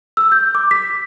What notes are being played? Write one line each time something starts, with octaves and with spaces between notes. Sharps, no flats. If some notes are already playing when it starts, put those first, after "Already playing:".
E6
G6
D6
B6